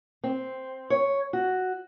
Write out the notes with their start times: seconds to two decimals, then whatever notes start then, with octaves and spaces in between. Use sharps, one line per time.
0.24 C4
0.90 C#5
1.33 F#4